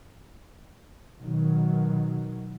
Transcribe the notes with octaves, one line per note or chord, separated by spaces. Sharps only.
B2 D#3 F#3